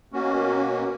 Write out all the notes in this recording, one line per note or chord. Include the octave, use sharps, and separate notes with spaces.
B2 A#3 C#4 F#4